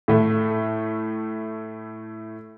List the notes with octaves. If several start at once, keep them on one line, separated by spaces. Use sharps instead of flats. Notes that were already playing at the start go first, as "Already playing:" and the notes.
A2 A3